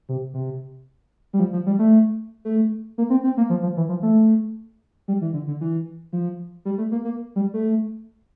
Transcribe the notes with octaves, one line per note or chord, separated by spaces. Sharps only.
C3
C3
G3
F3
F3
G3
A3
A3
A#3
C4
C4
A#3
F3
F3
E3
F3
A3
G3
E3
D3
D3
E3
F3
G3
A3
A#3
A#3
G3
A3